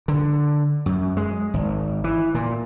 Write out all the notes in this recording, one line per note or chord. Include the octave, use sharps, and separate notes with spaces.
D3
F#2
G#3
G#1
E3
A#2